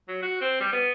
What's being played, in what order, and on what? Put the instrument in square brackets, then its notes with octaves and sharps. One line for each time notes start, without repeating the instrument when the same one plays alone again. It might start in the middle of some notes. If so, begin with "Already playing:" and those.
[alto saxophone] F#3
F#4
C4
G3
B3